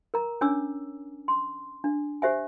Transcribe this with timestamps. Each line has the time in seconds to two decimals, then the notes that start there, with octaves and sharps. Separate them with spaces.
0.14 A#4 A#5
0.41 C#4 D4 C#5 G#5 D6 E6
1.28 C6
1.84 D4
2.22 G4 C5 E5 G#5